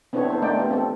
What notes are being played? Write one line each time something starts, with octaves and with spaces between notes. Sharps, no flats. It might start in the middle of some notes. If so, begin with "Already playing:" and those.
B3 C4 D4 E4 A4 C#5
D#4 A4 C5
A3 A#3 D4 D#4 D5 G5
B3 F4 G4
B3 C4 A4